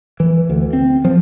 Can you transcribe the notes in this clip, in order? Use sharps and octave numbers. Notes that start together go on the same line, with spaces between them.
E3
D2
C4
F3